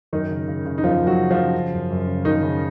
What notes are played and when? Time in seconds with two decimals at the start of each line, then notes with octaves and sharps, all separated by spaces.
0.13 F#2 D#3 D#4
0.30 C#3
0.48 C#3
0.65 C#3
0.78 D#4
0.84 F#2 F3 F4
1.01 F#2
1.07 F#3 F#4
1.18 C#3
1.31 F3 F4
1.36 C#3
1.54 C#3
1.72 F#2
1.90 F#2
2.08 C#3
2.25 F#2 D#3 D#4
2.43 C#3